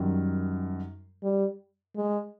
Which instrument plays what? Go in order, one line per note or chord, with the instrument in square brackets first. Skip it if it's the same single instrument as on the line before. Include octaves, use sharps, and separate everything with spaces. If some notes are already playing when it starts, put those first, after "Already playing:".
Already playing: [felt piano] F#2 D#3 G3
[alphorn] G3
G#3